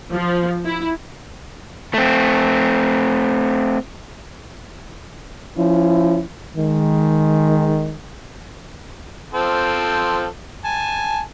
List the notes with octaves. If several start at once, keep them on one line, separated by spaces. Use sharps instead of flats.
F3
E4
A3 C4
F3 C#4 E4
D#3 G#3
F3 C4 A4
G#5 A5